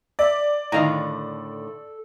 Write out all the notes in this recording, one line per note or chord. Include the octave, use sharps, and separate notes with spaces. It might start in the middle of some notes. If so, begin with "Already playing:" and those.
D5 E5
A2 D3 D#3 A4 D#5 F5 A#5